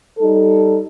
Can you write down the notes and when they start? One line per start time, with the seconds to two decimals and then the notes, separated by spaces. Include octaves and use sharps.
0.19 G3 D#4 A4